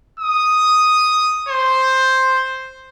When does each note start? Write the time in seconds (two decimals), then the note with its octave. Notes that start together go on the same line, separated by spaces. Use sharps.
0.20 D#6
1.49 C5